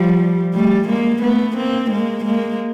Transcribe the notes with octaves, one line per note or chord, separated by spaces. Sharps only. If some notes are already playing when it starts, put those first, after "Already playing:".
Already playing: F3 G3
G3 A3
G#3 A#3
A3 B3
A#3 C4
G#3 A#3
G#3 A#3